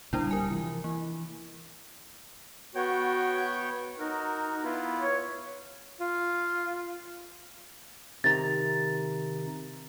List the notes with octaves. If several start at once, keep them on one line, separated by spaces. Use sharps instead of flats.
A#2 D3 G3 A#3 D4 E4
D1 G#1 G3 A#4 G#5
C3 E3 F3
E3 A#3
B3 F#4 C#5 G5
D#4 F#4 A#4
B3 E4 F4
C#5
F4
C3 D#3 A#5 A6